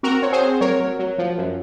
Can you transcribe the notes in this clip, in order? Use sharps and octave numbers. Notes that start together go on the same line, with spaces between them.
C4 F#4 A#4
C4 C#5
G#4 C5
C4
F#3 A#4 C#5
F#3
F#3
F3
F#2